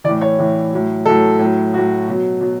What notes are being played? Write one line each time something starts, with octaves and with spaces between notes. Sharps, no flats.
A2 E3 D5
C#5
A2 E3
A2 F#3
A2 F#3 A4
A2 F#3
A2 F#3 F#4
B2 F#3
B2 F#3